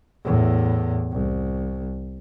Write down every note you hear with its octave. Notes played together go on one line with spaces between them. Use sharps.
E2 A2
C2